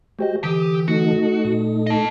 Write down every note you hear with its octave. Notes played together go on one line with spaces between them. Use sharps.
G#3 F#4 G4 C5 D#5
D3 E3 G4 D#6
A3 D#4 F#4
A#2
D#5 A5